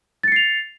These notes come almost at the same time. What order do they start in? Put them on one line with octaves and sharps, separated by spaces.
A6 C#7 C7 F7